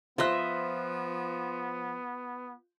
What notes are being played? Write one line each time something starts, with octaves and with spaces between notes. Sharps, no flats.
F3 B3 F4 C5 D#5 E5 C6 F#6